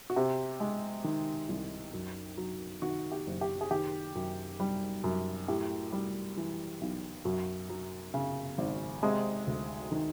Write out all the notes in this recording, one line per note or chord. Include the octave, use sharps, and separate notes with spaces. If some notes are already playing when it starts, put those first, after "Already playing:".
F#4
C3 G4
G#3
D#3
C2
F#2
F#3
D#3 F#4
G4
F#1
G4
G#4
D#3 G4
F#2
G3
F#2
A2 G4
G3
E3
B1
F#2 F#4
F#3
C#3
G#1
C3 G#3 G#4
D2
D#3